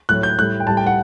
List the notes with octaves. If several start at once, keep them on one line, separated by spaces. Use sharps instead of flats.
A2 F#3 F#6
G6
A2 G3 F#6
G5
A2 G3 A5
G5
F#5